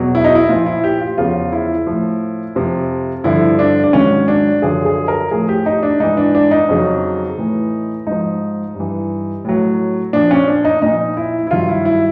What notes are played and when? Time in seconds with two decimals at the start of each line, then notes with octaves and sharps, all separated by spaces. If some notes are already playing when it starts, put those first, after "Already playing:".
Already playing: E2 B2 F#3
0.15 E4
0.24 D#4
0.35 E4
0.49 A#2 F3 F4
0.66 E4
0.84 G4
1.01 F4
1.18 E2 C#3 F3 F4
1.52 E4
1.87 A2 F3
2.55 F2 C3 F3
3.24 G2 D3 F3 E4
3.59 D4
3.84 D4
3.93 G#2 D#3 F#3 C#4
4.28 D4
4.62 F#2 D3 F3 G#4
4.85 G#4
5.08 A#4
5.31 A2 F3 G#4
5.49 G4
5.66 D#4
5.83 D4
6.00 G#2 E3 D#4
6.17 D4
6.35 D4
6.51 D#4
6.69 F2 C#3 F#3
7.38 A2 E3
8.07 G#2 F3 D#4
8.75 G2 E3
9.45 A2 F#3
10.13 A#2 F3 D4
10.31 C#4
10.48 D4
10.65 D#4
10.82 A#2 F3 D#4
11.17 E4
11.47 E4
11.51 G2 D#3 F#3 F4
11.69 E4
11.85 E4